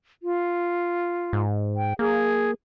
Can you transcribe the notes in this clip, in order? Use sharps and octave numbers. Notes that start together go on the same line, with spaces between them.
F4
G#2
G5
A#3 G#4